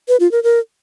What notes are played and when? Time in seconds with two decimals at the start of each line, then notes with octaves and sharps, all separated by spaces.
0.08 B4
0.20 F4
0.32 A#4
0.43 A#4